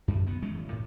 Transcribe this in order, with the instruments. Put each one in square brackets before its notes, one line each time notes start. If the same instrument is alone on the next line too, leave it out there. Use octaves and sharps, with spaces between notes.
[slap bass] F#2
D#3 B3
E3 G#3 A3 C#4
D1
A2